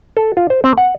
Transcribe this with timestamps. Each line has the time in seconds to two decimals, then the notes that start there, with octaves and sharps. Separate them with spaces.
0.17 A4
0.37 F4
0.50 C5
0.64 C4
0.78 F#5